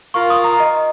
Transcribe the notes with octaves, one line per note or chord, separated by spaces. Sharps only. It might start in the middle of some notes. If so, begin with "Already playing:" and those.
F4 A#4 F5 C#6
D#6
A#5
D#5